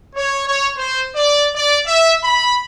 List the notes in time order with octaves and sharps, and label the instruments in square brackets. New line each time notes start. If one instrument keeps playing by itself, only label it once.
[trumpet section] C#5
C#5
C5
D5
D5
E5
B5